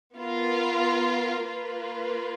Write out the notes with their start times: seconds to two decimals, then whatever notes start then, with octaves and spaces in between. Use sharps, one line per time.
0.17 B3 F4 A#4
1.45 A#3 F4 B4